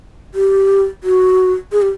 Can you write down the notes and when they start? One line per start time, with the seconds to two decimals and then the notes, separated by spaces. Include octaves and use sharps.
0.35 G4
1.04 F#4
1.72 G#4
1.82 G4